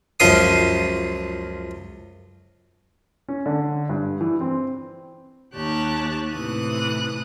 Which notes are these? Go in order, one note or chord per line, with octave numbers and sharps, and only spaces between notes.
C#2 F#2 F3 F5 D#6
C#4
D3
G2
E3
C4
D#2 G4 C#5 A5 F#6
A2 C3 E3 D#6 F#6